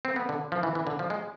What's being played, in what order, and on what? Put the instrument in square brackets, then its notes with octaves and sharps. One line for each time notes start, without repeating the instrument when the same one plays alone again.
[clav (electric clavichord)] C4
B3
D3
F3
E3
E3
D3
F3
G#3